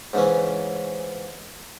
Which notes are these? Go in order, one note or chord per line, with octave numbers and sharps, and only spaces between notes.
G#2 C#3 E3 C#4